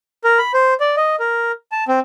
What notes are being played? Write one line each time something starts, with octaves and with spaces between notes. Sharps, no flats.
A#4
B5
C5
D5
D#5
A#4
A5
C4